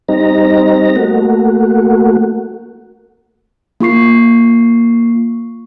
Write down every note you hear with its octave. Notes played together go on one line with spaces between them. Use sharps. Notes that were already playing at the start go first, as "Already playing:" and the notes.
G3 C4 D#4 A#5
A3 A#3 F#4
A#3 F4 C#6 C7